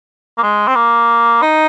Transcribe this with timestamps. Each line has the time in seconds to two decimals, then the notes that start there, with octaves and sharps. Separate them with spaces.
0.38 A#3
0.43 G#3
0.67 C4
0.75 A#3
1.42 D#4